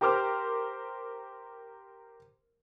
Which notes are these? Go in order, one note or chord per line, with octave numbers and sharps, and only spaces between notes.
G4 A#4 C5 D6 F6